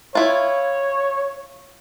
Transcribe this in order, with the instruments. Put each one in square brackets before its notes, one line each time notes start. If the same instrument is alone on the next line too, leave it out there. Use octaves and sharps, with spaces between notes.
[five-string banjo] E4 F4 [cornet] C#5